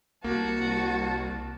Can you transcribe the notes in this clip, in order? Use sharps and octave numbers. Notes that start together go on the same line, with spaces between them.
C2 A#3 F#4 A5